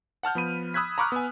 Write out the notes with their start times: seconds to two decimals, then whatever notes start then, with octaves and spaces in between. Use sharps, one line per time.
0.23 F#5 A5 F6 G6
0.35 F3 B3 B5 D#7
0.74 B5 D#6 E6 F#6 G#6 B6
0.98 A#5 B5 C#6 D6 F6 F#6
1.12 B3 G#5